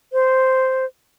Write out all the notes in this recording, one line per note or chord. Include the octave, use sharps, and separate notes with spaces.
C5